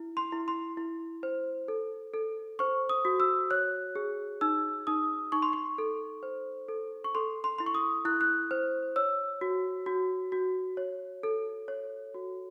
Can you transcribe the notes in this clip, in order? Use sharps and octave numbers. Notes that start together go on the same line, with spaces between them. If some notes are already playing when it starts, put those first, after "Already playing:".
Already playing: E4
C6
E4
C6
E4
C5
A4
A4
C5 C#6
D#6
F#4
E6
C#5 F#6
G#4
D#4 E6
D#4 D#6
D#4 C#6
C6
C#6
A4
C5
A4
C#6
A4 C6
C6
E4 C6
C#6
D#6
E4 F#6
F#6
C5
C#5 E6
F#4
F#4
F#4
C#5
A4
C#5
F#4